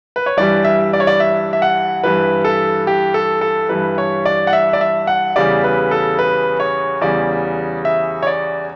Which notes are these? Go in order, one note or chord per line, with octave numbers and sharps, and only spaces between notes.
B4
C#5
G2 E3 G3 D5
E5
D5
C#5
D5
E5
E5
F#5
G2 E3 G3 B4
A4
G4
A4
A4
G2 E3 G3 B4
C#5
D5
F#5
E5
D5
E5
F#5
E2 C#3 G3 D5
B4
A4
B4
C#5
E2 C#3 G3 D5
E5
C#5
D5